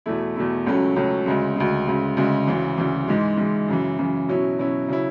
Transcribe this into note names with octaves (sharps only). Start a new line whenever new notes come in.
E2 B2 A3 E4
E2 B2 A3 E4
C#2 C#3 F#3 A3 C#4
C#2 C#3 F#3 A3 C#4
D2 C#3 G#3
D2 C#3 G#3
D2 C#3 G#3
D2 C#3 G#3
D2 C#3 E3
D2 C#3 E3
G#2 E3 G#3
G#2 E3 G#3
F#2 C#3 E3
F#2 C#3 E3
B2 F#3 C#4 E4
B2 F#3 C#4 E4
C#3 F#3 C#4 E4